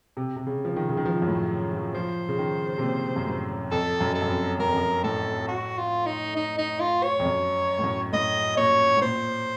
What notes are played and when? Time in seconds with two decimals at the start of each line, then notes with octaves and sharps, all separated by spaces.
0.17 C3
0.36 C3
0.47 C#3
0.65 F3
0.76 D#3
0.89 C#3
0.97 D#3
1.05 F3
1.22 F#2
1.28 A2
1.72 F3
1.94 F3 C5
2.29 C#3
2.38 D#3
2.78 C3
2.82 A#2
3.16 F#2
3.27 A2
3.71 F2 A4
4.01 F#2
4.15 A4
4.22 F#2
4.30 F2
4.59 F#2 A#4
4.68 F2
4.76 F#2
5.03 A2 A4
5.48 F#4
5.78 F4
6.06 D#4
6.36 D#4
6.58 D#4
6.80 F4
7.03 C#5
7.20 F2
7.25 F#2
7.79 A2
7.84 F#2
8.13 A2 D#5
8.57 A#2 C#5
8.97 A2
9.02 A#2 C5